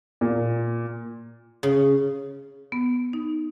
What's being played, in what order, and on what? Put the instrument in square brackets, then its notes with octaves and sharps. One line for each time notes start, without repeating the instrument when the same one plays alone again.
[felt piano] A#2
[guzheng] C#3
[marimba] B3
D#4